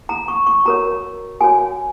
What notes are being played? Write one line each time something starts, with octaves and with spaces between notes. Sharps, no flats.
A#5
C#6
C#6
F#4 A#4 C#5 A#5
F#4 A#4 C#5 G#5